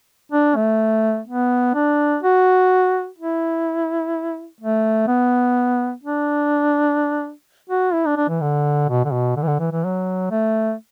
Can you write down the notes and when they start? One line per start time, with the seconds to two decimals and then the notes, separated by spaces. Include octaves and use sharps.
0.31 D4
0.56 A3
1.27 B3
1.74 D4
2.23 F#4
3.18 E4
4.60 A3
5.07 B3
6.03 D4
7.69 F#4
7.93 E4
8.06 D4
8.16 D4
8.28 E3
8.41 D3
8.89 B2
9.05 D3
9.12 B2
9.36 D3
9.42 E3
9.47 D3
9.59 E3
9.72 E3
9.84 F#3
10.31 A3